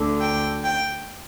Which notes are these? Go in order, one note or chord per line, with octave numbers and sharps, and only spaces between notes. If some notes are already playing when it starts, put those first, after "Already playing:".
Already playing: D2 D3
G5
G5